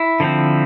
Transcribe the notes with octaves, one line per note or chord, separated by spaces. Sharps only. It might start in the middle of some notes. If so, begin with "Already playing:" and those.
Already playing: E4
D3 F3 C4